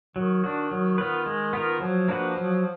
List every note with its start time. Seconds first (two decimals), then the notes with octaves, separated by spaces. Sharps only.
0.16 D#3 F#3
0.44 D4 F#4
0.71 F#3
0.98 B3 F4 B4
1.26 G#3
1.53 B3 F4 A#4
1.80 F3 F#3
2.08 A#3 D4 F#4 B4
2.37 F#3